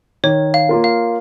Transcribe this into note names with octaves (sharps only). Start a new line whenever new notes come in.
D#3 C#5
F5
A#3 F4 A#4
F5